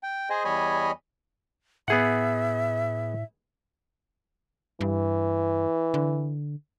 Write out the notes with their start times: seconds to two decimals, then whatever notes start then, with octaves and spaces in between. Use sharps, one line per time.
0.03 G5
0.30 G#4 C5 D#5 G#5
0.45 E2 G3 C#5 D#5 G#5 B5
1.88 A2 B3 G#4 E5 F#5
4.81 G2 E3
5.94 D3